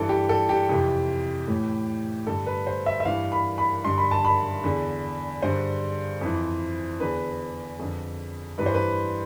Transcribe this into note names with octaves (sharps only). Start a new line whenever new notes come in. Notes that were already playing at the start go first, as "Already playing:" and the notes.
Already playing: G2 E3 A4
G4
A4
G4
F2 C3 E3
A2 E3
G2 D3 A4
B4
C5
E5
E5
G2 E3 F5
B5
B5
G2 D3 C6
B5
A5
B5
E2 D3
G2 D3 C5
F2 E3
E2 D3 B4
F2 D3
G2 E3 B4
C5
B4